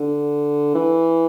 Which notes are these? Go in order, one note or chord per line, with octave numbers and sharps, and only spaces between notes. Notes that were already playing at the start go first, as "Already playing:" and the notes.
Already playing: D3
E3